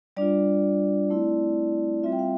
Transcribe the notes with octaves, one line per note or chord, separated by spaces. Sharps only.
G3 D4 F4 D5
A3 C4 E4
G3 C4 F4 E5
G5
F5